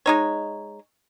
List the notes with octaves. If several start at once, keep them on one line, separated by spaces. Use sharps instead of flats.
G#3 D#4 C#5